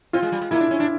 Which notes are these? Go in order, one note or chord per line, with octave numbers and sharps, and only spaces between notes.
C4 F4
G#3
G3
G#3
A#3 E4
D4
C#4
D4